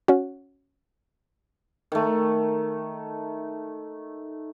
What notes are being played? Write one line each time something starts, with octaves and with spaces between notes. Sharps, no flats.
C#4 F#4
D#3 A3